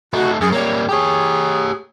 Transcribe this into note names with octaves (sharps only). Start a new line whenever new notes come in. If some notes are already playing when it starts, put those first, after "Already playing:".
A3 D#4 F#4
F#2 G#4
G3 A#3 C#5
G4 G#4 C#5